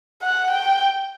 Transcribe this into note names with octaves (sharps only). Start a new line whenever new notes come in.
F#5
G5